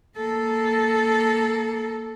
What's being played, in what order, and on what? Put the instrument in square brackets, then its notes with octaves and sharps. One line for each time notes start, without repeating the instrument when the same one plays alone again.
[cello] A#3 A4